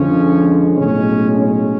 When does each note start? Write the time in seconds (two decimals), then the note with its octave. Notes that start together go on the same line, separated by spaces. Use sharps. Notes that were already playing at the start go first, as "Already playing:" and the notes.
Already playing: F2 D3 F3 G#3 C#4
0.78 B1 A2 G#3 C#4
1.34 C#4